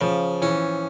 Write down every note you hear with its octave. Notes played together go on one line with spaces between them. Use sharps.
C#3 F3
E3 C#4